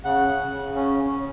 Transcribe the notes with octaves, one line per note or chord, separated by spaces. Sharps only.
C#3 F#5
C#3
C#3
C#4
C#4